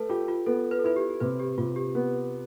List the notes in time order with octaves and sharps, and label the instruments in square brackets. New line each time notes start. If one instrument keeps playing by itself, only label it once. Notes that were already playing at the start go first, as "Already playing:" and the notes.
Already playing: [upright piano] A3 [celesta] A4 B4
[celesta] F4 [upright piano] G4
[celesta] F4
[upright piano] B3 [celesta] A4
[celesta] B4
A4
[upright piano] E4 [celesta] B4
[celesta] G4
[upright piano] C3 [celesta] B4
[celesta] G4
[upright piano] C3 [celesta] F4
[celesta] G4
[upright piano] B3